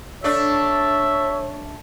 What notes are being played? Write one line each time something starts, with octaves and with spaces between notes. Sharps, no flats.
A3 D4 C#5 E5